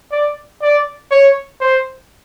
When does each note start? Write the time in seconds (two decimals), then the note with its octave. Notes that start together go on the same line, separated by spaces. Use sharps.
0.11 D5
0.62 D5
1.11 C#5
1.61 C5